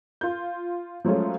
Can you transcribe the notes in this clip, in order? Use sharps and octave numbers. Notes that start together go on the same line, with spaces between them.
F4 G6
F3 F#3 G#3 A3 C#4 F4